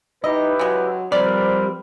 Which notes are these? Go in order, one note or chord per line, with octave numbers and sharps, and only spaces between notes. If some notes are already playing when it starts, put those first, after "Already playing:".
D#4 E4 G4 B4 D#5
C#3 F#3 G#3
F3 G3 C4 A#4 B4 D5